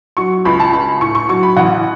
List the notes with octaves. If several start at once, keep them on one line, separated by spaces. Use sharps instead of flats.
F#3 C#6
C#2 B5
A5
C#2 B5
A2 C#6
C#6
F#3 C#6
B5
A1 F#5